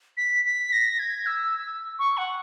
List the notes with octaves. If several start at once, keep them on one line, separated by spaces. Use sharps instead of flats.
B6
B6
A#6
G#6
E6
C#6
F#5